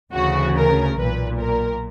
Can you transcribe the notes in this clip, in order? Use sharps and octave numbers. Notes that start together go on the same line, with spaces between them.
D2 C#3 E3 F#4
A#4
B1 A#2 B4
A#4